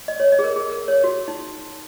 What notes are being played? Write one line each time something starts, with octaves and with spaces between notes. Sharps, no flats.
D#5
C#5
D#5
G#4
A#4
G#4
A#4
C#5
F#4
D#4